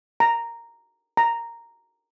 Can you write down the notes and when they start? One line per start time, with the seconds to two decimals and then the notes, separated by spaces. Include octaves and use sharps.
0.20 A#5
1.17 A#5